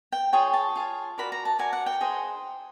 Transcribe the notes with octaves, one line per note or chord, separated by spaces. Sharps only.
G5
F4 G#4 C#5 G5
A5
F4 G#4 C#5
F#4 A#4 D5 B5
A#5
A5
F#4 A#4 D5 G#5
F#5
G5
D#4 G#4 C5